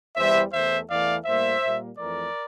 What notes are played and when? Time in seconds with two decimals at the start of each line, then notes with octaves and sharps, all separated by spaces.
0.16 E2 E3 G3 C5 E5
0.52 E2 E3 A3 C5 E5
0.89 E2 E3 A3 D5 F5
1.25 A2 G3 A#3 C5 E5
1.62 A#2 G3 A#3
1.97 F2 E3 A3 A#4 D5